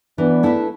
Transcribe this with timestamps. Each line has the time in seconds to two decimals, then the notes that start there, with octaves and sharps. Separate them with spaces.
0.18 E3 B3 D4
0.43 A3 E4 B4